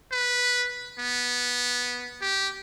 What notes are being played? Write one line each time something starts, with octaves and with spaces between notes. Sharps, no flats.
B4
B3
G4